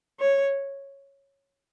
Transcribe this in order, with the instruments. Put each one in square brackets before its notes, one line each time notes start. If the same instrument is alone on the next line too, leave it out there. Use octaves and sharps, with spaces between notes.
[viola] C#5